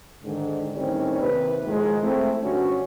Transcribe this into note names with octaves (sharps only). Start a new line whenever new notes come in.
G#2 D3 D#3
A2 D#3 G3 C4 C#4 D#4
D#2 C3 B4
A2 D#3 F3 G#3
A3 C4 E4
G2 D3 C#4 F#4